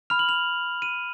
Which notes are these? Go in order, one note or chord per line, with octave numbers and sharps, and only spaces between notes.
B5 F6 F7
F#7
F7
D#7